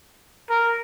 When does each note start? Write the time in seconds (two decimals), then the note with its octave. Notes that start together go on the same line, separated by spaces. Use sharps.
0.50 A#4